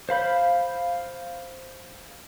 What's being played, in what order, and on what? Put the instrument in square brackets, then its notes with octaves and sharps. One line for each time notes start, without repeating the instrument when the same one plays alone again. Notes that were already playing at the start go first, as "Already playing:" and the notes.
[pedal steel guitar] C5 F5 B5 G6